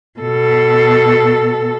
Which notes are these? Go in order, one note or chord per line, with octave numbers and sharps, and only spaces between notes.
B2 A4